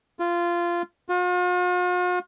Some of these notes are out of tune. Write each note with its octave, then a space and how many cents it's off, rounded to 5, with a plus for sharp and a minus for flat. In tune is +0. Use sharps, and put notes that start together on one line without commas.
F4 -15
F4 +45